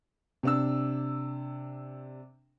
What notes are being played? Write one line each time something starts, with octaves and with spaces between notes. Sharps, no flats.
C3 D4 E6